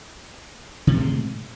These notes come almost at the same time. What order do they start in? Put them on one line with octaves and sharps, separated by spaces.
C3 D#3 A2 G#3